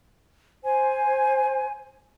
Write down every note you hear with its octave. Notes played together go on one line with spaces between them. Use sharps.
C5 G#5